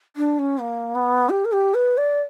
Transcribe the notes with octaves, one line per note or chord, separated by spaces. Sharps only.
D4
C#4
A#3
B3
G4
A#4
G4
B4
D5